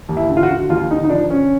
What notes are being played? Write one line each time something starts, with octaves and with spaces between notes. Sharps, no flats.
D#2
E4
D3
F4
F#4
D3
D#2 F4
D3 D#4
D#4
F3 D4
D3 C#4